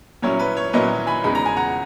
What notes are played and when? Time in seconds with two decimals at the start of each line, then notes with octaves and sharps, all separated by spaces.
0.22 A#2 F#3 C#4 E4 C#5
0.39 B4
0.57 C#5
0.73 A#2 F#3 C#4 E4 B4 D#5
1.07 G#5 B5
1.24 E2 C#3 G#3 D#4 B5
1.35 A#5
1.46 G#5
1.57 F#5 A#5